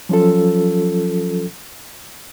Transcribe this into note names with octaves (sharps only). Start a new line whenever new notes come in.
F3 F#3 C#4 F4 A4